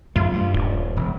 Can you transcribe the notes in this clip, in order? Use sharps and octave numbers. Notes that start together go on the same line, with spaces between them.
F#2 A3 F4
G2
D#1
E1